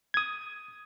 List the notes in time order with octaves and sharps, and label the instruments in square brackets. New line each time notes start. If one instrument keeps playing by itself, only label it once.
[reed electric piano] D#6 G#6